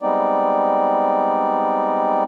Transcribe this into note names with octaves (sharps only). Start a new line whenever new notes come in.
G3 G#3 B3 C4 D#4 D5